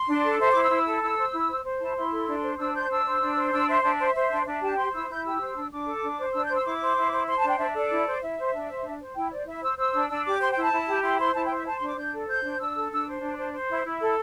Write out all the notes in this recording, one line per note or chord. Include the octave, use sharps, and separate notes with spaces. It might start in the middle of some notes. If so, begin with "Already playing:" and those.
Already playing: C6
D4
A4
C5 E5
D6
E4
E6
E4
A4
E4 E6
C5
E4
C5
C5
E4 A5
E4 C6
A4
D4
C5
D4 E6
C5 G6
D4 E6
C5
D4
C5
D4 E6
C5 E5
D4 E5
C5
C5
D4
D4 E5
G4 A5
C5 C6
E4 E6
E4 G6
G4 E6
C5
D4
D4 D6
A4
D4
C5
D4 E6
G6
C5
E6
E4 D6
C5
E4
C5
C5 C6
A5
D4 G5
D4 E5
A4 D5
E4
C5
E4 E5
C5
D4
C5
D4
C5
E4 G5
C5 D5
E4 E5
C5 E6
C5 E6
D4
D4 E6
G4 D6
C5 C6
G5
E4
A5
E4
G4
E4 C6
C5 C6
E4 A5
G5
C5
E5
C5 A5
D4 C6
D6
D4 G6
A4
C5 G6
D4
D4 E6
A4
D4 E6
C5
D4
C5
C5
E4
E4
A4